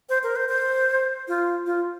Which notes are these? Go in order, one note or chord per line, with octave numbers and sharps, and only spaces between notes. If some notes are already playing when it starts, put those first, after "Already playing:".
C5
A#4
C5
C5
F4
F4